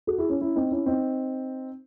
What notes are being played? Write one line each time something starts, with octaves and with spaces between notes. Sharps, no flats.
F#4 A4
E4 G#4
C#4 E4
C#4 E4
C4 D#4
C#4 E4
C4 D#4